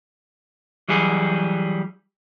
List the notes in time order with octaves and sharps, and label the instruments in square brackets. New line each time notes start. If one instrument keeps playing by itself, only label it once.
[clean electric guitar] E3 F#3 G3 G#4